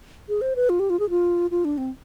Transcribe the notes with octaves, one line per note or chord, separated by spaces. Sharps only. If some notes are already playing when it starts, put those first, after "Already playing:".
G#4
C5
B4
F4
G4
F4
G#4
F4
F4
D4
C4